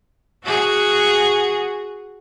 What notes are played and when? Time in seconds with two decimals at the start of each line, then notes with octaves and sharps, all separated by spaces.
0.45 F#4 G#4